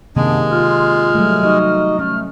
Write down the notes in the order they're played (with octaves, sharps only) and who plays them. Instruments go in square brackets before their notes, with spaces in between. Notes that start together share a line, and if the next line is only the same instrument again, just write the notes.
[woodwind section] F#2 B3 D4 [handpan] C3 D#3 A#3 [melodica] G#3
[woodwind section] F4 [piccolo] F6
[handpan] F#3 G3 A3
[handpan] F#3 [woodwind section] D#4 F#4 D#5
[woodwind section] A3 [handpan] C#4 [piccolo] F6